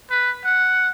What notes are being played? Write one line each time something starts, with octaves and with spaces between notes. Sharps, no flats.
B4
F#5